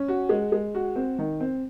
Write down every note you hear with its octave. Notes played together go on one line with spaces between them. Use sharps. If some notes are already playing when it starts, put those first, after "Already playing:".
Already playing: C#4
F#4
G#3
G#3
F#4
C4
D#3
C4